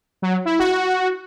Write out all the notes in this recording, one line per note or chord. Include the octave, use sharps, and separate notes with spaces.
F#3
E4
F#4